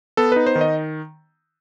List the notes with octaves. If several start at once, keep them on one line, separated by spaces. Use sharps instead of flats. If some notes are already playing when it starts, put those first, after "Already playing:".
B3 A4
D#4 B4
C5
D#3
D#5